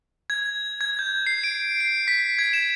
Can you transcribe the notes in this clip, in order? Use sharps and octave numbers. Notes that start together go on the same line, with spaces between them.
G#6
G#6
G6
C7
D7
C7
B6
G#6
E7